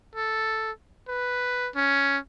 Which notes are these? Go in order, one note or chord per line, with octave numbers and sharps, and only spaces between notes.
A4
B4
C#4